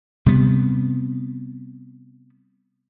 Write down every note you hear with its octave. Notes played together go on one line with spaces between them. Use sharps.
C3 G3 B3